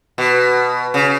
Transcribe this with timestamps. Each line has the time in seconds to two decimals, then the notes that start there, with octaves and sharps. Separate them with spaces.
0.18 B2
0.94 C#3